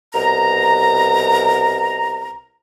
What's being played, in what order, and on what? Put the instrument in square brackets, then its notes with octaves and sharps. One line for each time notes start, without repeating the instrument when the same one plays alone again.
[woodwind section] C2 B2 A#5